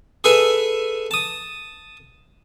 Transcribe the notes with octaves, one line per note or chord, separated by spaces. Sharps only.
G#4 A4 B4 E5 G#5
A5 D#6